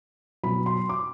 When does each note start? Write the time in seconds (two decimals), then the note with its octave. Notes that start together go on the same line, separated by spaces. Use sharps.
0.43 B2 F#3 B3 B5
0.66 C6
0.89 D6